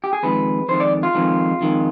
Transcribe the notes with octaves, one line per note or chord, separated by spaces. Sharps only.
G4
G#4
F2 D#3 G#3 B4
F2 D#3 G#3 C5
D5
F4
F2 D#3 G#3
F2 D#3 G#3